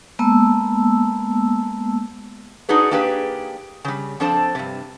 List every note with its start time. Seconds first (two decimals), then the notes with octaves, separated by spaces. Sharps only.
0.19 G#3 A#3 B3 A5 E6
2.69 D4 D#4 F#4 G#4 B4
2.91 A#3 D4 G4 G#4 B4 G5
3.85 C#3 G3
4.20 F3 C4 D4 A4 C5 A5
4.55 G2 C3